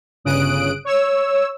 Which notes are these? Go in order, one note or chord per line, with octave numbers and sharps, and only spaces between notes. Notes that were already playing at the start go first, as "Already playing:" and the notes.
G1 C#3 D#6 F#6 D7
C#5 E6